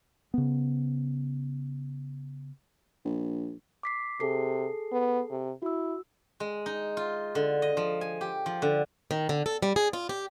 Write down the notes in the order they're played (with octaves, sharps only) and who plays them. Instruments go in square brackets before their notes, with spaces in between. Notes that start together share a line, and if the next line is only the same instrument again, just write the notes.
[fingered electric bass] C#3 B3
[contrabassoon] A#1
[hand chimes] D6 B6 C7
[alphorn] C3 [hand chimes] G#4 A4 C7
[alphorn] B3
C3
[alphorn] E4 [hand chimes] F#4 E6
[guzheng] G#3
D#4
F4
D3
D#5
F3
G#5
G4
F3
D3
[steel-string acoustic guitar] D#3
D3
A4
G3
G#4
F4
G4